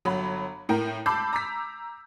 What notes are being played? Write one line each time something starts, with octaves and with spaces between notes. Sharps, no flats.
G1 F#3 B5
A2 A#4 G5
A5 B5 D6 E6 G6 C7
A#5 D6 E6 B6